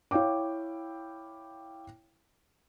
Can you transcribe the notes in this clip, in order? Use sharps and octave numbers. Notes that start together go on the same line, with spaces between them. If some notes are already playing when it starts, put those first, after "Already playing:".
E4 C#5 F5 G5 D6